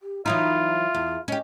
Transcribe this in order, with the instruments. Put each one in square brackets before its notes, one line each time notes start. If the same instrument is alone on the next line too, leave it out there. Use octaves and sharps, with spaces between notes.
[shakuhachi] G4
[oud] E3 F#3 D#4 [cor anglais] F4 [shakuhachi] E5
[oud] E2
[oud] C#4 G4 [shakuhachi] D#5